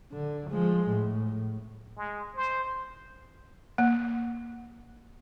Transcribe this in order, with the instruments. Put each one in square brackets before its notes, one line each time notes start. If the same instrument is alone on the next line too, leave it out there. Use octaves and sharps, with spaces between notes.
[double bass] D3
F3 G#3
A2
[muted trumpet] G#3
C5
[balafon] A#3